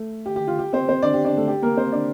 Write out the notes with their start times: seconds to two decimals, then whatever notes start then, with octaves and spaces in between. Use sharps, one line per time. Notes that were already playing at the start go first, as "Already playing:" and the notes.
Already playing: A3
0.26 G4
0.36 G4
0.47 F4
0.59 G4
0.73 C4 C5
0.88 C4 C5
1.03 D4 D5
1.14 G4
1.25 D4 D5
1.37 A3 A4
1.48 G4
1.62 A#3 A#4
1.77 C4 C5
1.92 D4 D5